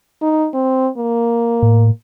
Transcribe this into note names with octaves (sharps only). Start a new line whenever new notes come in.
D#4
C4
A#3
A2